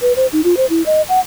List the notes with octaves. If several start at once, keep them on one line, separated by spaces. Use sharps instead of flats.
B4
C5
D#4
F4
C5
E4
D#5
F#5